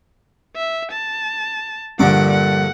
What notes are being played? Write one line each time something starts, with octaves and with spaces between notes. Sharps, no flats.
E5
A5
A#1 G2 D3 F#5 D6
F#5